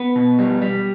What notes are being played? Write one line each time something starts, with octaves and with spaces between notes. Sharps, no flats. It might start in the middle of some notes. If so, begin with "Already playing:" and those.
Already playing: B3 B4
B2
G3
G3